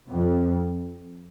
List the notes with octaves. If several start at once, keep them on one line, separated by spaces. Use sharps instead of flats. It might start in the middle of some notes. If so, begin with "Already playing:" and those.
F2